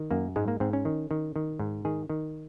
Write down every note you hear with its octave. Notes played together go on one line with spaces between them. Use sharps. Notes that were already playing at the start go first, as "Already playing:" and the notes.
Already playing: D#3
F#2 A#3
G#2 G#3
A#3
G#2 C4
C#4
D#3
D#3
D#3
G#2
D#3 G#4
D#3